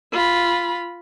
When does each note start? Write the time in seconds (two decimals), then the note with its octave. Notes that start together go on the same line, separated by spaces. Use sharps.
0.13 F4 B5